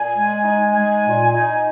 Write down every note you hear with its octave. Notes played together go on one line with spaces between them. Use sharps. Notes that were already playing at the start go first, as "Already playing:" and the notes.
Already playing: A#2 G#5
G#3
D#4
G#3 G#5
A#2
D#4